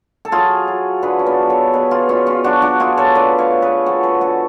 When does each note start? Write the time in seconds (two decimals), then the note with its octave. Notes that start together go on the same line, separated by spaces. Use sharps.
0.25 A4
0.32 F#3 F4 G#4
0.68 F#3
1.03 D3 G#4 B4
1.19 C#4
1.26 B3 D4
1.38 F#3
1.50 A4 C#5
1.73 B2 G#4 B4
1.91 F4 G#4
2.09 B2 C#4 F4
2.26 C#4 F4
2.44 F#3 D4 F#4
2.62 D4 F#4
2.80 A3 F4 G#4
2.97 A4 C#5
3.15 D3 B4 D5
3.38 C#5 F5
3.51 A3
3.62 G#4 B4
3.86 F3 F#4 A4
4.03 G#4 B4
4.21 D3 F#4 A4